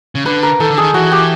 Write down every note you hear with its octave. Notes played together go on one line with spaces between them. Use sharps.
C#3
D3 B4
A#4
D#3 A4
D3
D#3 G#4
E3 F#4
G4